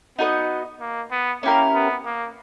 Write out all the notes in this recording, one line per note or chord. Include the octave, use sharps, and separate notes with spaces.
B3 D#4 F#4 B4 D#5
A#3
B3
A#3 C#4 E4 G4 A#4
B3
A#3